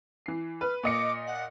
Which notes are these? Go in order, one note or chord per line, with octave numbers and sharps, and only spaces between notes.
E3 C7
B4 F6
A#2 D#5 D6 C#7
F#5